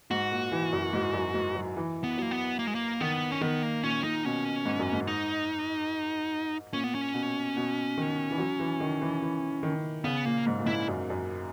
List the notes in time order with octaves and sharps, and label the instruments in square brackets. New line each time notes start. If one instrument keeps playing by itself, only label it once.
[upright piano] G#2 [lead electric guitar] F#4
[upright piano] A#2
E3
F#2
G#2
F#2
G#2
F#3
E3
[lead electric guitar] B3
[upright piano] F#3 [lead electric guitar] A#3
[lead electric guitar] B3
A#3
G#3
A#3
[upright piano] D#3 [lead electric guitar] B3
[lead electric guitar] C#4
[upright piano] D#3 [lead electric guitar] B3
[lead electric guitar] A#3
[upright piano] A#2 [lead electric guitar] C#4
[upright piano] A#2 [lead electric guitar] D#4
[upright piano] B2 [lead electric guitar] C#4
[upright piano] G#2
F#2
G#2
[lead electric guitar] D#4
[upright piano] A#2 [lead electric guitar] C#4
[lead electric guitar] B3
C#4
[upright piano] B2
B2
D#3
E3
F#3
E3
D#3
E3
E3
D#3
[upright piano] C#3 [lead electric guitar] B3
[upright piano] A#2 [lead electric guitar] A#3
[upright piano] G#2
A#2
[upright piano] G#2 [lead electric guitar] E4
[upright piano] F#2
F#2